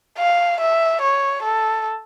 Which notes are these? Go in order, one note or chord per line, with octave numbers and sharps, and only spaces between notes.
F5
E5
C#5
A4